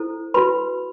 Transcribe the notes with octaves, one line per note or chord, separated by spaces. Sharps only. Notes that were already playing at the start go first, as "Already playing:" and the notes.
Already playing: E4 A4 C5
F#4 B4 B5